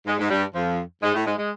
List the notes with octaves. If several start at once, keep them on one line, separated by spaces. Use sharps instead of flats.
G#2 G#3
G#2 G#3
G2 G3
F2 F3
G#2 G#3
A2 A3
G#2 G#3
G#3